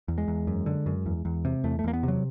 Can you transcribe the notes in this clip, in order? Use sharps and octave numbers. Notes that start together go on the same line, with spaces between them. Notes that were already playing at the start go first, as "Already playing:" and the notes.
E2
G#3
E2
F#2
D3
F#2
E2
E2
C3
E2 A3
A3
E2 A#3
B3
C3 F#3